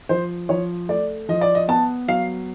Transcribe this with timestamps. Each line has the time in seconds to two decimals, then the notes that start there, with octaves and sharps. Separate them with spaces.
0.09 F3 C5
0.49 F3 C#5
0.89 A3 D5
1.29 F3 D#5
1.41 D5
1.55 D#5
1.68 B3 A5
2.08 F#3 F5